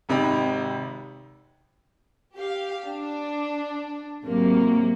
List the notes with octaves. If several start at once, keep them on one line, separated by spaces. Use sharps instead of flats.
G#1 C3 D#4 G5 B5
G4 F5
D4
G#1 C3 F#3 A#3